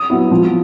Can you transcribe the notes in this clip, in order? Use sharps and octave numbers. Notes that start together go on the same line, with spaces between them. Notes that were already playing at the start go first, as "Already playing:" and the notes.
Already playing: D#6
F#3 B3 E4
F3